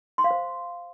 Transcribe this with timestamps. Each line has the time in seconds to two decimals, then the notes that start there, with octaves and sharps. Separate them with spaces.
0.18 C6
0.24 F5
0.31 C5